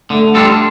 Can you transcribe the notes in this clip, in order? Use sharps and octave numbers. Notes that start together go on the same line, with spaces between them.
D3 A3
G3 D4 F4 A4